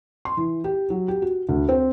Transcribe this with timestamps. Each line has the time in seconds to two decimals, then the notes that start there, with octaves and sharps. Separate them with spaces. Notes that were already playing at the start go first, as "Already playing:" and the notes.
0.25 C6
0.37 E3
0.64 G4
0.90 F#3
1.08 G4
1.22 F#4
1.49 D2
1.69 C4